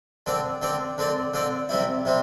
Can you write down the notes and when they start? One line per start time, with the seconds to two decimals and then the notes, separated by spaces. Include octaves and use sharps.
0.26 D3 C4 A4 D5
0.62 D3 C4 A4 D5
0.98 D3 C4 A4 D5
1.34 D3 C4 A4 D5
1.69 C3 G3 C4 E4
2.05 C3 G3 C4